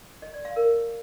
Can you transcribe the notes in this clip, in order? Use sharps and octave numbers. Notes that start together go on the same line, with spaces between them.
D#5
D5
F5
A#4